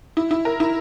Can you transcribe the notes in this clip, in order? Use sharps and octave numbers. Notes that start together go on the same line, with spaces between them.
E4
E4
A#4
E4